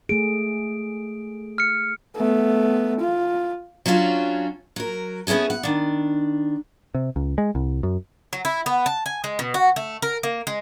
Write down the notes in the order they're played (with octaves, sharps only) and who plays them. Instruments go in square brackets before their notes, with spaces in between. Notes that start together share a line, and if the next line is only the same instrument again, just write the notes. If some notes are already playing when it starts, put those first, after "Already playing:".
[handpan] A3 G#4 [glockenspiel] D7
[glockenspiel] F6 C#7
[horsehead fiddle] A3 B3
F4
[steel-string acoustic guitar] F#3 C#4 D4 F4 F#4
F#3 A#4
B3 C#4 E4 G#4 A4
F#5
D#3 D4
[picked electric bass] C3
C#2
G#3
C2
F#2
[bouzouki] F#3
E4
B3
A5
G#5
G#3
B2
F#4
A3
A#4
A#3
G#3